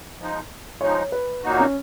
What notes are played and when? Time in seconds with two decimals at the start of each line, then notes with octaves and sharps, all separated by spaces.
0.18 F3 G#3 D#4
0.81 F3 G#3 D#4 C#5
1.12 B4
1.44 A#2 F#3 A#3 D#4 F#4
1.59 C#4